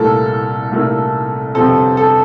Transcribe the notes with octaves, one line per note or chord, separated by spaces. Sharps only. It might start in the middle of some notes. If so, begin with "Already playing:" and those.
Already playing: C2 A#2 A3 E4 A4 A#4
C2 A#2 A3 E4 A#4
G1 F2 C3 F3 C4 A4
A4